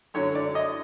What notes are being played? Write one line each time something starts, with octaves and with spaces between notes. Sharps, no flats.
F#2 D3 F#3 C#5
D5
D#5